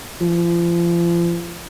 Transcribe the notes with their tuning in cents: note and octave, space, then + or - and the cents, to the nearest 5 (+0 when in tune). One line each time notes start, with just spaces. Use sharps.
F3 -35